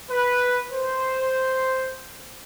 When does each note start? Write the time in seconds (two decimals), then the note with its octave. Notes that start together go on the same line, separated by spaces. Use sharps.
0.11 B4
0.72 C5